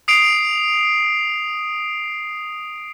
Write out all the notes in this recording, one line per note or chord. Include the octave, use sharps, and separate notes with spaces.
D#6 C7 D7 F7